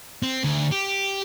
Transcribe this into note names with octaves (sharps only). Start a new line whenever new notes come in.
C4
D2
G4